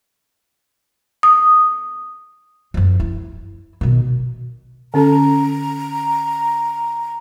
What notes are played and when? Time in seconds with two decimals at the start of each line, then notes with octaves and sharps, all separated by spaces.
1.23 D#6
2.74 F#2 F3
3.00 E4
3.81 B2 D#3
4.94 D3 C#4 A4 A#5